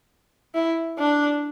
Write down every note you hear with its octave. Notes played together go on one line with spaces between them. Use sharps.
E4
D4